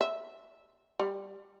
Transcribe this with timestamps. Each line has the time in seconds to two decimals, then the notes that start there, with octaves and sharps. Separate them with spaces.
0.01 E5
0.99 G3